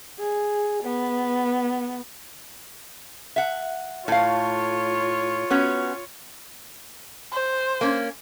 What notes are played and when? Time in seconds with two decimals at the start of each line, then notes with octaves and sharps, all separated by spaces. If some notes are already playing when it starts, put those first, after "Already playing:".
0.19 G#4
0.83 B3
3.36 E5 F#5
4.08 A2 F4 C#5 F5
5.50 B3 C#4 F#4
7.32 C5
7.81 A#3 C#4